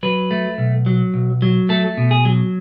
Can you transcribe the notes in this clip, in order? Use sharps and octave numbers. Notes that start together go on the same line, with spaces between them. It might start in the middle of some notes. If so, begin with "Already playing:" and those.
F#3 B4
A3
B1
F#3
B1
F#3
A3 A4
B2
G#4
F#3